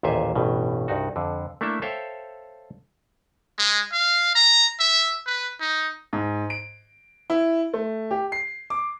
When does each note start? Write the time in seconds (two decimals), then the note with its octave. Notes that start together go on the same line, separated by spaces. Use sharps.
0.03 A1 D#2 A#2 C5 E5 G#5
0.36 A1 G2 B2
0.88 C2 G2 D#4 F#4
1.16 F2 D3
1.61 A3 A#3 D4 E4 A4 E5
1.82 A4 C5 C#5 E5 F5 G5
3.59 G#3
3.92 F5
4.35 A#5
4.80 E5
5.27 B4
5.60 D#4
6.13 G#2
6.50 D7
7.30 E4
7.73 A3
8.11 G4
8.32 C7
8.70 D6